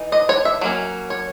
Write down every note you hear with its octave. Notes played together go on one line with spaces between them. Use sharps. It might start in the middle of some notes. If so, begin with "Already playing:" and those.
Already playing: E3 D#4
D#5
C#5
E5
F#3 A#3 C#4
C#5